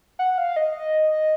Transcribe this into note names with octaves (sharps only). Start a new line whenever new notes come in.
F#5
F5
D#5